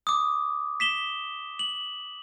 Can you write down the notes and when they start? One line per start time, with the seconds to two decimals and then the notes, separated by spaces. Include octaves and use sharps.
0.07 D6 D#6
0.80 B6 E7 G7
1.59 F#7